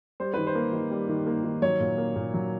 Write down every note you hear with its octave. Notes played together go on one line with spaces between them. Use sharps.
G3 C5
D#3 B4
C5
A#3
D#3
G3
D#3
A#3
D#3
F#3 C#5
A#2
A#3
A#2
F#3